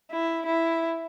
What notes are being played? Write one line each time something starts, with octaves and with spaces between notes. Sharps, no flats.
E4
E4